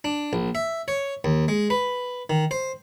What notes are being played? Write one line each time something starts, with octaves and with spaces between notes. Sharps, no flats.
D4
A#1
E5
C#5
D#2
G#3
B4
D#3
C5